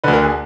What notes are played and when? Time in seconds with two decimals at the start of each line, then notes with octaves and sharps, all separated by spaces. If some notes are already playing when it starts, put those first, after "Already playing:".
0.04 D2 D3 B4
0.13 A#4
0.24 G#4